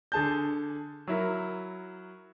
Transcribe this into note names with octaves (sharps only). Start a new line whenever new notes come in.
D3 G#4 A5 G6
F#3 E4 A#4